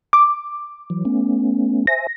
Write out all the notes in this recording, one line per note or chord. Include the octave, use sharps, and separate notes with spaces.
D6
E3 F#3
A3 B3 C#4
C5 E5 G#5 A#6